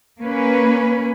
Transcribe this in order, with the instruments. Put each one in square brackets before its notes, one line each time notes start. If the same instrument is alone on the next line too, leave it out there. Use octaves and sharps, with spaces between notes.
[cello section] A#3 C#4 B4